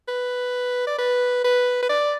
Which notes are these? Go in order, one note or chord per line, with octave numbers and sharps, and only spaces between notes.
B4
D5
B4
B4
B4
D5